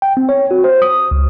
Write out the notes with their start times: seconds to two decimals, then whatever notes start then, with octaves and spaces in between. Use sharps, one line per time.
0.02 G5
0.17 C4
0.29 C#5
0.51 F#4
0.64 C5
0.82 D#6
1.11 C#2